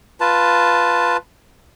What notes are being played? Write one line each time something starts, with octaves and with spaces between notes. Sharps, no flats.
F4 B4 A5